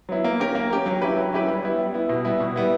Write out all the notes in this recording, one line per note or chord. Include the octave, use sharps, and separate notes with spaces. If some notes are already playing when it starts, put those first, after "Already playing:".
F#3 B3 E4
A#3
C#4 G4 A#4
A#3
C#4 G4 A#4
F#3
C#4 E4 G4 B4
F#3
C#4 E4 G4 B4
G3
B3 E4
G3
B3 E4
B2
G3 B3 E4
B2
G3 B3 E4